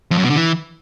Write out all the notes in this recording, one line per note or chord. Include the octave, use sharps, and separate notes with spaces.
F2
F#2
B2
D3
E3